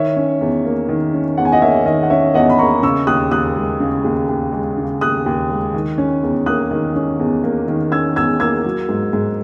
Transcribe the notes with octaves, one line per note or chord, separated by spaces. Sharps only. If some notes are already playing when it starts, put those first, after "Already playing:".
Already playing: D#3 C#5 E5
C#4
E2
A#3
D#3
C#4
E2 F#5
G#5
D#5 F#5
A#3 C#5 E5
D#3 D#5
F#5
C#4 C#5 E5
E2 D#5 F#5
B5
A#3 A#5 C#6
C#3 C#6 E6
D#2 D#6 F#6
D#2 D#6 F#6
G#3
C#3
D#2
D#2
G#3
C#3
D#2 D#6 F#6
D#2
G#3
D#3
C#4
E2
A#3 D#6 F#6
D#3
C#4
E2
A#3
D#3
C#4 E6 G#6
E2 E6 G#6
A#3 E6 G#6
F#3
G#2
G#2